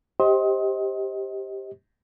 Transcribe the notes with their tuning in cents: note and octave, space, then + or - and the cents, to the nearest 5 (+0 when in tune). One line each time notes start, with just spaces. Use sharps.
G4 +0 C5 +20 D#5 +25